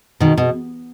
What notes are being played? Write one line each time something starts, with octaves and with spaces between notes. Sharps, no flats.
B2 D#3
B2